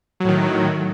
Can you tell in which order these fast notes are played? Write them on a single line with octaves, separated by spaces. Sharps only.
F#3 A2 D#3